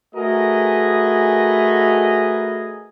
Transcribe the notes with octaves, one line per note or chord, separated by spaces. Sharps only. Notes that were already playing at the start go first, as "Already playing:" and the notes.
A3 F#4 G#4 A#4 B4 D#5